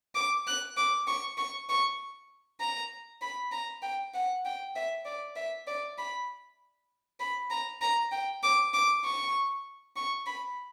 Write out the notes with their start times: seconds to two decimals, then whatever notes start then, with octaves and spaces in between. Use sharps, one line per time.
0.15 D6
0.47 F#6
0.77 D6
1.07 C#6
1.37 C#6
1.69 C#6
2.60 A#5
3.21 B5
3.52 A#5
3.82 G5
4.14 F#5
4.45 G5
4.75 E5
5.06 D5
5.36 E5
5.67 D5
5.98 B5
7.20 B5
7.50 A#5
7.81 A#5
8.12 G5
8.43 D6
8.74 D6
9.04 C#6
9.96 C#6
10.26 B5